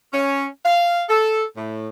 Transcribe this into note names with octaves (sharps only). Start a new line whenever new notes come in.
C#4
F5
A4
A2